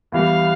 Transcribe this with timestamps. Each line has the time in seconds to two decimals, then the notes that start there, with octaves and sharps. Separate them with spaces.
0.12 E2 E3 G3 F5